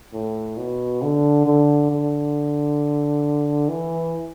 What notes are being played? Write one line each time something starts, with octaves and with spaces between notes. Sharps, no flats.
A2
B2
D3
D3
D3
E3